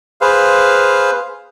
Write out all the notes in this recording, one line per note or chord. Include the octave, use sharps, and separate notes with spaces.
G#4 B4 C5 F5